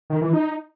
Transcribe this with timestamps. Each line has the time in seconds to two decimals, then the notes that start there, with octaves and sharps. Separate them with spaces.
0.10 D#3
0.21 E3
0.33 D#4